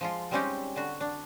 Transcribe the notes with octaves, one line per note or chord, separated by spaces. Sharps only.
F3 G#3 F4
G3 G#3 C4 C#4 D#4 G4
D3 F#4
D4